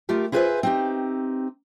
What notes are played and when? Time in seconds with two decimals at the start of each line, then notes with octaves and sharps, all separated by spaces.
0.09 A3 F4 G4 A#4
0.32 E4 F4 G#4 B4 C5 E5
0.63 C4 D#4 G4